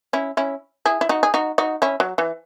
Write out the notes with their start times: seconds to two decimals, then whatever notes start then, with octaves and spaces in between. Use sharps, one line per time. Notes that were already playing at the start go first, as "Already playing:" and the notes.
0.13 C#4 E4
0.37 C#4 E4
0.86 E4 G#4
1.01 E4
1.09 D#4 F#4
1.23 G#4
1.34 D#4 F#4
1.58 D#4 F#4
1.82 C#4 E4
2.00 F#3
2.18 E3